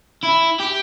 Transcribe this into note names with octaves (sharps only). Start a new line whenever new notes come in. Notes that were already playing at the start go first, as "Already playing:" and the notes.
E4
G4